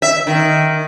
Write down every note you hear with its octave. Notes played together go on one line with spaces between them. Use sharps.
E5
D#3